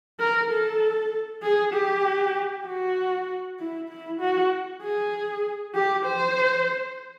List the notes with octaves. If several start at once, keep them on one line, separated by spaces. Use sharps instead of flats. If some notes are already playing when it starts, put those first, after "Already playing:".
A#4
A4
G#4
G4
F#4
E4
E4
F#4
G#4
G4
C5